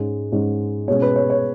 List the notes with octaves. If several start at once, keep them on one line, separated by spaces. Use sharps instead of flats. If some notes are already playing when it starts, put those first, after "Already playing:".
Already playing: G#2 G#3 C#4
G#2 G#3 C#4
B2 G#3 C#4 C#5
B4
C#5
C#5